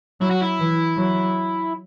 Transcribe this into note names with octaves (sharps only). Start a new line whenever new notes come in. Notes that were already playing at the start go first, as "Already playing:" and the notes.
F#3 E4
F#4
E4
E3
F#3